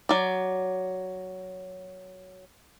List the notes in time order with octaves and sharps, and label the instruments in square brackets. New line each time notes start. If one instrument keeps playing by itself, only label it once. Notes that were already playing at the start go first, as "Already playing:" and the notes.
[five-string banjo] F#3 D5